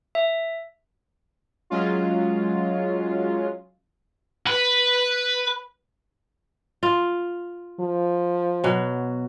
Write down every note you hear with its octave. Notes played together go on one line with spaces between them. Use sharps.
E5
F#3 G#3 C#4 F4
B4
F4
F3
B2 F#3